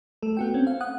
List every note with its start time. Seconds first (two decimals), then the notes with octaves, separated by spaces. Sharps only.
0.23 A3 A4
0.37 B3 F#4 G5
0.54 C4 C#4
0.67 F5
0.81 F#5 D#6 F#6